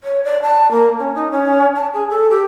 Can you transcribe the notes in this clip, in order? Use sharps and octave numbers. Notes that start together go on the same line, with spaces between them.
C#5
D5
A5
A#3
C#4
D#4
C#4
A5
G#4
A4
G4